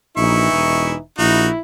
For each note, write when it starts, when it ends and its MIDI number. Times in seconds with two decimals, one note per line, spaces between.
0.17 0.49 34
0.17 0.97 52
0.17 0.97 63
0.17 0.93 64
0.17 0.93 85
0.51 0.94 28
1.18 1.50 34
1.18 1.47 63
1.18 1.60 64
1.18 1.47 66